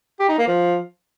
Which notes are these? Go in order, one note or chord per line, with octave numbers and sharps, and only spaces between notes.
G4
D#4
A#3
F3